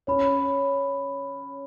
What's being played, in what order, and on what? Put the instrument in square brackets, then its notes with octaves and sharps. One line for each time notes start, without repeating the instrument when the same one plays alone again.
[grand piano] C#4 [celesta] C#5 B5